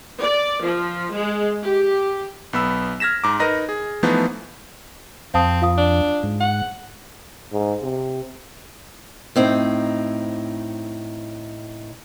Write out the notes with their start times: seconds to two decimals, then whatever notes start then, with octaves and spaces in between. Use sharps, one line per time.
0.20 D5
0.62 F3
1.12 G#3
1.63 G4
2.53 B1 B3 B5 E6
3.00 F6 G#6 A#6 B6 E7
3.24 G#2 A#5 D6
3.40 D#4 A#4 B4 D#5 A#6
3.69 G#4
4.03 E3 F3 A3 B3 D#4
5.34 F2 C4 F5 A5 D#6
5.62 F4 F5 D#6
5.78 D4
6.23 G#2
6.40 F#5
7.52 G#2
7.82 C3
9.36 A2 C4 D#4